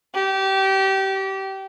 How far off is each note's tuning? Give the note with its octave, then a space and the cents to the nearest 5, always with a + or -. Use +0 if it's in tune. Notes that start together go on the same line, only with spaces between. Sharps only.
G4 -25